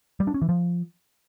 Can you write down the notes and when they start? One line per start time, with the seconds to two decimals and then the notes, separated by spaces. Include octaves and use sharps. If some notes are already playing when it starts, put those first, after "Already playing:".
0.20 G3
0.27 D4
0.34 C#4
0.42 E3
0.49 F3